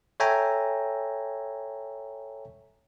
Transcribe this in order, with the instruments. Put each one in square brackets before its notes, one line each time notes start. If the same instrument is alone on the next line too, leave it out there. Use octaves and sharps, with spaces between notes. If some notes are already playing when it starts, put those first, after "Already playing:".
[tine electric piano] A4 C#5 E5 G5 G#5 A#5